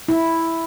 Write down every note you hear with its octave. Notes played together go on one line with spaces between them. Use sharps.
E4